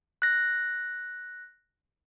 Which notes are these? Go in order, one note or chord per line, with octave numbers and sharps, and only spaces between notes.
F#6 A#6